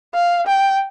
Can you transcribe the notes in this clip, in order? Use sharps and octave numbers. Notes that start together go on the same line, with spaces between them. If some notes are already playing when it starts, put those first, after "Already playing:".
F5
G5